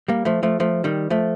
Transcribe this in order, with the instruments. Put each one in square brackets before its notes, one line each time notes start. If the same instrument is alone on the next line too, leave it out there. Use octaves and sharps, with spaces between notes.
[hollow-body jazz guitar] G3 A#3
F3 A3
F3 A3
F3 A3
D#3 G3
F3 A3